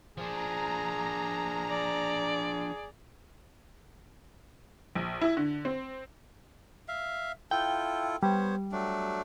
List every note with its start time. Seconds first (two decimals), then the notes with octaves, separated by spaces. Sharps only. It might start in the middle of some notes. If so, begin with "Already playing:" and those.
0.18 F3 D4 G#4 A#5
1.70 D5
4.95 A#1
5.21 E4
5.37 D3
5.65 C4
6.88 E5 F5
7.51 E4 F4 A4 G5
8.23 G3 B3 C5 C#5
8.72 F#3 A3 D4